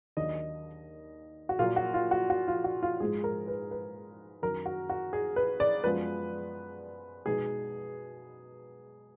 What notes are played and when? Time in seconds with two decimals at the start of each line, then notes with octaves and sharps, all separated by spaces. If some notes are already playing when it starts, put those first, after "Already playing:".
0.17 D#2 D#3 F#3 D4 D#5
1.49 F#4
1.59 A#2 F#3 A#3 F4
1.76 F#4
1.94 F4
2.11 F#4
2.30 F#4
2.48 F4
2.64 F#4
2.83 F4
3.00 G#2 F3 G#3 G#4
3.24 A#4
3.48 B4
3.71 B4
4.42 F#2 D#3 F#3 A#4
4.66 F#4
4.89 F#4
5.13 G#4
5.36 B4
5.60 D5
5.84 F#2 F3 G#3 B3 B4
7.26 B2 G#3 D#4 G#4